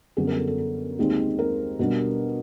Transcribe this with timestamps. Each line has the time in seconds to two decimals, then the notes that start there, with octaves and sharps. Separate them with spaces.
0.17 F#2 D3 G3 B3 G#4
0.27 A#4
0.37 A4
0.47 A4
0.58 A4
0.98 D#2 D#3 G#3 C4 D#4
1.39 A#4
1.79 B2 G3 B3 D4